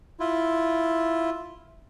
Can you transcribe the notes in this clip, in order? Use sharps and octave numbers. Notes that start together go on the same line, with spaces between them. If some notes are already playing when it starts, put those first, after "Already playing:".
E4 F4